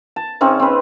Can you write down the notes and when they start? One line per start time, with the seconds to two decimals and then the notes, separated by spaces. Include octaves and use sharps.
0.16 A5
0.41 C#3 C4 C#4 D#4
0.60 C4 B4